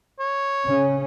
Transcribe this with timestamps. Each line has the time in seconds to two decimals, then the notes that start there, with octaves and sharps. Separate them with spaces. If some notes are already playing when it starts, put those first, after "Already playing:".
0.20 C#5
0.67 C#3 C#4